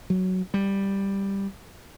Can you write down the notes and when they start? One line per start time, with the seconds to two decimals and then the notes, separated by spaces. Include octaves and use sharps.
0.10 F#3
0.54 G3